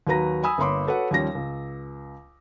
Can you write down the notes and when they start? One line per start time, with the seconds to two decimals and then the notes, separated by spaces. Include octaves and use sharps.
0.07 D#2 F#3 F#4 B4 A#5 A#6
0.43 G#5 B5 D#6 E6
0.58 G1 A#3 C#5 B5 C6 D6
0.87 F#4 A4 B4 C#5 F#5
1.11 D#2 F3 G3 C#4 A#6
1.35 C#2